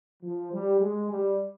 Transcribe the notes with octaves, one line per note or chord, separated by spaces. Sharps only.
F3
G3
G#3
G3